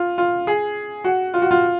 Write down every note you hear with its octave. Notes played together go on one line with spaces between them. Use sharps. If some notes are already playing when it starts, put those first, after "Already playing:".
Already playing: F4
F4
G#4
F#4
F4
F#4
F4